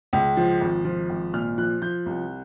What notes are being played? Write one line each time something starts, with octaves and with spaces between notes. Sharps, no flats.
C#2
F3
G#1
F3
G#1
A#2 F6
F3 F#6
F3 G6
C2